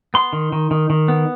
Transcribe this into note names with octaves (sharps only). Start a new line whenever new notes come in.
B3 C6
D#3
D#3
D#3
D#3
B3